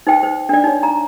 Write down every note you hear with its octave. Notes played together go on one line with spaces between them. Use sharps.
D#4 C5 G5
C5
D4 D5
D#4 C#5
A#5